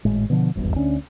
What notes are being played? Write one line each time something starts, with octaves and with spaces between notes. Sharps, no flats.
G#1 A2 G#3
B2 D3 F3
D#1 G#1 E2 G2
D2 C#4 D4